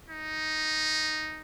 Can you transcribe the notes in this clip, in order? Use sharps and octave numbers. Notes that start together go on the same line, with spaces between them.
D#4